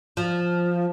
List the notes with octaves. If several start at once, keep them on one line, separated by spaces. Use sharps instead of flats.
F3